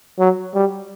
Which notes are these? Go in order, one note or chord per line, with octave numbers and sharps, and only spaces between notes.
F#3
G3